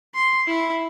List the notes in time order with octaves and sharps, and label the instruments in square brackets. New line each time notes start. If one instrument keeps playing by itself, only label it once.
[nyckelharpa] C6
E4 E5